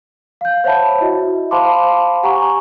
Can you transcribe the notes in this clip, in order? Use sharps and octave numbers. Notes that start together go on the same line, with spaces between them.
F5 G6
C5 C#5 E5 F#5 A5 B5
E4 F#4 D#5 E5
C5 F5 A5 B5 C6 D6
G4 F#5 G#5 A#5 C#6